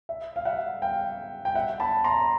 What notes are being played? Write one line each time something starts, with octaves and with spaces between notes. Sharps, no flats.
E5
F5
E5 F#5
F5 G5
G5
E5 F#5
A5 B5
A#5 C6